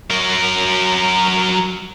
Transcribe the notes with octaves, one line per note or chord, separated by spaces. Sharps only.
F#3 A#4